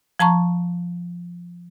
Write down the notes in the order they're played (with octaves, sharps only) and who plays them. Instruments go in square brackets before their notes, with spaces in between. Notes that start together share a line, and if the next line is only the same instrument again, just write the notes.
[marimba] F3 A5 A#5 C#6